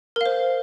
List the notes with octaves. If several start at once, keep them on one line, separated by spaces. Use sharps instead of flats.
A#4 C5 F5